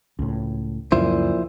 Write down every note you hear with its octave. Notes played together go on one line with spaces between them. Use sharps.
C#2 A2
C#2 F#2 A#2 F3 E4 C5